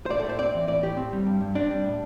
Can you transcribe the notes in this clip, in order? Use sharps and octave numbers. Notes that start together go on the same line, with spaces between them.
C5
A2 D5
A4
A2 C5
C4 D5
E3
A2 D5
A2 G4
C4
G3
G2
G2
C4 D4
G3
A2